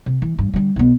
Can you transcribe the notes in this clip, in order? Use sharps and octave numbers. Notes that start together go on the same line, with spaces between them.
C3
E3
G2
D3 G3
B1 B3